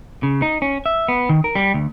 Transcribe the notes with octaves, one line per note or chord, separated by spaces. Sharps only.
C#3
D#4
C#4
E5
B3
D#3
A#4
G3
D2